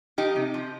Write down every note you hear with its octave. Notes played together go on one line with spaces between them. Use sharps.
F3 D#4 G4
C3
F3